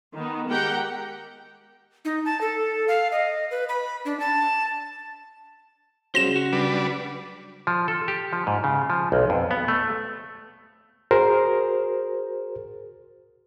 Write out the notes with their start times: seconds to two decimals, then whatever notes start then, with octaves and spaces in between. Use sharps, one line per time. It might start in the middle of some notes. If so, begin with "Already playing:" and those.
0.13 D#3 B3
0.48 G#3 G4 A#4 F#5 G5
2.05 D#4
2.25 A5
2.41 A4
2.88 F5
3.12 D#5
3.51 B4
3.69 B5
4.05 D4
4.20 A5
6.15 C#3 F#3 G3 C5 A#6 E7
6.36 F#4
6.53 G3 D4 B4
7.67 F3
7.88 A4
8.08 G4
8.33 F3
8.47 G#2
8.64 C#3
8.90 F3
9.12 B1
9.30 F2
9.51 B3
9.68 A3
11.11 F#4 G#4 A#4 C5